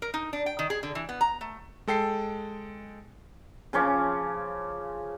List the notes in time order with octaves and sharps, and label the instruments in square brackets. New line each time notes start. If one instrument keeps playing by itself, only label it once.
[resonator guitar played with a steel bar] A#4
D#4
D4
G5
D#3
G#4
D3
E3
B3
A#5
A3
[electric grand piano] G#3 A4 G5 C7
[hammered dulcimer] C#3 F3 C#4 D6